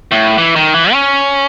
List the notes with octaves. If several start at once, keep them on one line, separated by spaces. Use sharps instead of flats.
A2
E3
D#3
E3
C#4